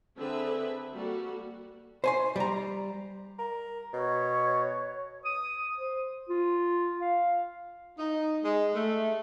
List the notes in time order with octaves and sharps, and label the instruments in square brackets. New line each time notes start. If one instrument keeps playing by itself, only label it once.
[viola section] D3 C4 G#4 B4 E5
G3 A#3 F#4 A4
[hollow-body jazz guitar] C5 G#5 C6
G3 A#5
[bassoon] A#4
[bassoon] B2 [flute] C#5
[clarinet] D#6
C5
F4
F5
[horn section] D#4
G#3
A3